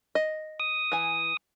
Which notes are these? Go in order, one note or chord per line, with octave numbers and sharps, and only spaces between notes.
D#5
D#6
E3 G#5